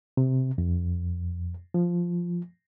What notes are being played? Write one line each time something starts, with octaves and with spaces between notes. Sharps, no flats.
C3
F2
F3